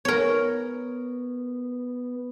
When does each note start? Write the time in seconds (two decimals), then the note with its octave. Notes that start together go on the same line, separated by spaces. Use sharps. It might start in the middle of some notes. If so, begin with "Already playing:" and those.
0.05 B3 A#4 C#5